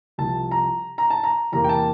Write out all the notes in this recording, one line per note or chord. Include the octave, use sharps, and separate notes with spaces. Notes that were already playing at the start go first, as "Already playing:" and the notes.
C2 C3 F3 A5
A#5
A#5
A5
A#5
E2 C3 E3 A#3 A#5
G5
A5